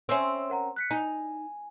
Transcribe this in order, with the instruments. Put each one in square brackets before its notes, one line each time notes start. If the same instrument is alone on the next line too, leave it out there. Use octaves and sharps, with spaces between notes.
[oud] C4 C#4 [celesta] E5 C6 E6
[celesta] A#4 F#5 A#5
F#6 B6 C#7
[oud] D#4 [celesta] G#5